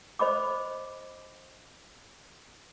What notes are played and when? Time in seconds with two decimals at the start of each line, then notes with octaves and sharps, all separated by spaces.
0.19 C5 D#5 B5 D6